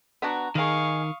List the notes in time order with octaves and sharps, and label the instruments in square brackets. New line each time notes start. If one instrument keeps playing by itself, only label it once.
[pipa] B3 D4 F#4 [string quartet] A#5
[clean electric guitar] D#3 A#4 [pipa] D#4 G#4 [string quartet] F5 C#6 D#6